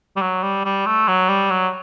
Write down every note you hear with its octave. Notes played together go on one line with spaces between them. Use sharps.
G3
F#3
G3
G3
A3
F#3
G3
F#3